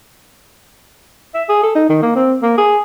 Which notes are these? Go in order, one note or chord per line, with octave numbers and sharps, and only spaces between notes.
E5
G#4
A4
D#4
D#3
A#3
C4
A#3
G#4